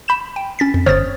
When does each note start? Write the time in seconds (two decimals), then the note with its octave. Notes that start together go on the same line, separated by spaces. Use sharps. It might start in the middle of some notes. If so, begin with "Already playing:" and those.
0.08 B5 G6 E7
0.36 G5
0.59 C#4 A6 B6
0.74 F2
0.86 G1 C5 C#5 D#6 F6 A6